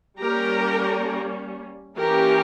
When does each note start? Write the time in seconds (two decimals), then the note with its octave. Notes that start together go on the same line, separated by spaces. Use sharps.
0.20 G3 A#3 C#4 G4 A#4
1.98 E3 A#3 C#4 G4 A#4